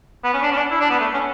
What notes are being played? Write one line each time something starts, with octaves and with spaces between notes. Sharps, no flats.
B3
C#4
D4
C#4
D4
E4
D4
B3
A3
C#4